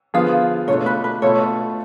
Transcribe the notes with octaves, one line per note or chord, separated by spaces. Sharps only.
D3 F3 B3 F4 G#4 F5
B2 A3 D4 F4 C#5
B4
B4
B2 A3 F4 A4 C#5